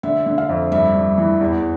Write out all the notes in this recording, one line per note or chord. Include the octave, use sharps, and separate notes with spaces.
D3 E5
D3
F5
F2
G2 E5
G2
E3
E2